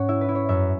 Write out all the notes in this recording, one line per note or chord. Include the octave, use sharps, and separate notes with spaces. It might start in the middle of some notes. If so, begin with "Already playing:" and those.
Already playing: G#2 C#4 C#5 F#5
E4 E5
B4
E4
C#5
F#2 E5